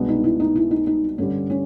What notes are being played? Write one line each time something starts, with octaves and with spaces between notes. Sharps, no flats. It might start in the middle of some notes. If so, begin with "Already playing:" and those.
Already playing: C2 B2 G#3 B3 D4
D#4
E4
D#4
E4
D#4
D#4
G2 D3 G3 C#4
C#4